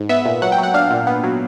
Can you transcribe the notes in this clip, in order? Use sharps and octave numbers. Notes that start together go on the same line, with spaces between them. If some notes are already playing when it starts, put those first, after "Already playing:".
Already playing: G#2
B3 E5
A#2
F#3 F#5
G5
F#3
F#5
D4 F5
A#2
B3
F#3